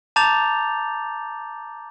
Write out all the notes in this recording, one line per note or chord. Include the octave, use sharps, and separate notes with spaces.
A5 A#5 D6 G6 A6 F7